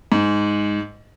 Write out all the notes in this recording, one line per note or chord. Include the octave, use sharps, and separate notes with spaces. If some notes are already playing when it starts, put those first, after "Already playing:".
G#2